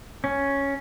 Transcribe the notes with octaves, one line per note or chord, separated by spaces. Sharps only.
C#4